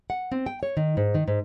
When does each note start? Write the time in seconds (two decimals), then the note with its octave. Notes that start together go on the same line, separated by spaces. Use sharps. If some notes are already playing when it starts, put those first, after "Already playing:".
0.10 F#5
0.32 C4
0.46 G5
0.63 C#5
0.77 D#3
0.97 G#2
1.15 D#3
1.28 G#2